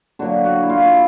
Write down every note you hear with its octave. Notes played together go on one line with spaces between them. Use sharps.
D3 F#3 A#3 F#4
F#4
E4
F4
E4